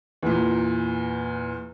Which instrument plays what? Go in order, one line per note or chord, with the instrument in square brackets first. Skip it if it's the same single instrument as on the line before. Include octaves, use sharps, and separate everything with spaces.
[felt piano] E2 A#2